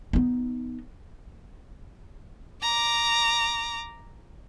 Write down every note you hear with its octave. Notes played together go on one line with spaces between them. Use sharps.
B3 D#4
A#5 D6